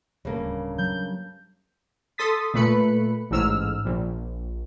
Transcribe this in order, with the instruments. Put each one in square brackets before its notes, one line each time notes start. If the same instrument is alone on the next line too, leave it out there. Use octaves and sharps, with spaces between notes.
[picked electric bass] D1 [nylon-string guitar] G2 C#3 A#3
[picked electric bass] F#3 [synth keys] G6
[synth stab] A4 C6 D#6 A6 B6
A#2 A3 B4 B5 C#7
A1 G#2 E6 F6
A#1